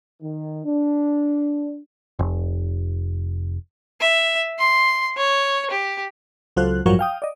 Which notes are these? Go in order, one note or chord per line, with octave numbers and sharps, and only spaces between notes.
D#3
D4
F1
E5
C6
C#5
G4
C#2 F#3 F4 A4 C5 F#6
A1 G2 F3 F#3 A#4 C#6
F5 G5 D#6
D5 D#5